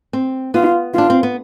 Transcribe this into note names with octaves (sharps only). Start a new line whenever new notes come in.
C4
B3 F4
D4 F4
C4
B3